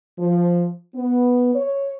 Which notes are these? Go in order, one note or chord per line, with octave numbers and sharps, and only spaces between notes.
F3
B3
C#5